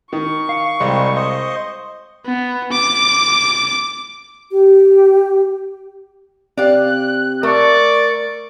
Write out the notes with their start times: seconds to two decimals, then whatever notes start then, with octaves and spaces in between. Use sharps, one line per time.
0.13 D#3 C#6
0.49 F5
0.80 C2 G3 G#3 C5
1.16 C5 D#5
2.26 B3
2.72 D6
4.52 G4
6.57 C4 G4 D5 F5 F#6
7.43 A3 A#4 D5 C#6